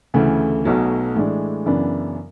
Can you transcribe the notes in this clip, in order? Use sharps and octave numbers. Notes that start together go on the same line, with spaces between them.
D2 C#3 E3 A3
B1 B2 F#3 A3
A2 E3 G#3 D4
F#2 C#3 E3 B3 D4